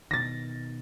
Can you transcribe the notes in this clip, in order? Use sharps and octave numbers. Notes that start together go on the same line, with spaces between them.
B2 D#3 A6 A#6